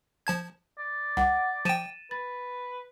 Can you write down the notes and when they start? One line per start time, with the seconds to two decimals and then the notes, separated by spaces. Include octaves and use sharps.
0.27 F3 A5 G#6
0.79 D5
1.17 C2 F#5 D6
1.65 F3 G5 A6 D#7 E7
2.11 B4 A6